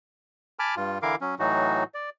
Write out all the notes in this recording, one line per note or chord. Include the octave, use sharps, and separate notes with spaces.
G#5 A5 B5 D6 F6
G2 F4
D3 E3 E4 A#4 F5 D6
F#3 C#4
A2 E3 F#3 D#4 F#4
D5